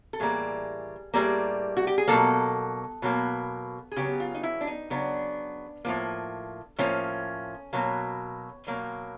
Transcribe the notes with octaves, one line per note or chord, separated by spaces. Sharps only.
A4
A2 E3 G3 A#3 G#4
A2 E3 G3 A#3 G#4
F#4
G4
G#4
B2 F#3 A#3 A4
B2 F#3 A#3
G#4
C#3 F#3 B3 G4
F4
D#4
E4
D4
D#4
C#3 F#3 B3 D4
A2 F3 A#3
A2 F3 A#3 C#4
B2 F#3 A#3
B2 F#3 A#3